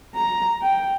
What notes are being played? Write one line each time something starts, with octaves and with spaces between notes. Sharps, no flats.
A#5
G5